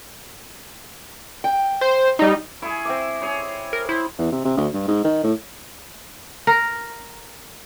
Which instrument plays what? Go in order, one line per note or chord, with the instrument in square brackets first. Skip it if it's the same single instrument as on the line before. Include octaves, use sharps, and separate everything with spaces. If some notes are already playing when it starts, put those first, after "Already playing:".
[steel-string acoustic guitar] G5
[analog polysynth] C5
G3 D#4
[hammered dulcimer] E4 G#4 [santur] C#6
[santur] C4 E5 D6
[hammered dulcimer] G#4 C#5
[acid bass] A#4
[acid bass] E4 [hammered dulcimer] C5
[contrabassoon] E2
C3
C3
D2
G2
G#2
D#3
A2
[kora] A#4